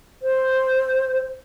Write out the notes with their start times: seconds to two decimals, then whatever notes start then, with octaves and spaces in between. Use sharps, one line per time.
0.23 C5